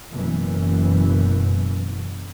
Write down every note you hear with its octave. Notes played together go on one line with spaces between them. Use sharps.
F#1 F#2 B2 E3